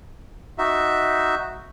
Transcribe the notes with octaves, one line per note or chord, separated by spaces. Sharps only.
D#4 F#4 E5